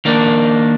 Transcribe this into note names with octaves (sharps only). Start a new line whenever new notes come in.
D#3 A#3 D4